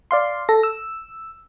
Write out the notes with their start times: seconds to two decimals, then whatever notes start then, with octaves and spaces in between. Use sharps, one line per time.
0.11 D5 F5 C6
0.49 A4 A#6
0.63 E6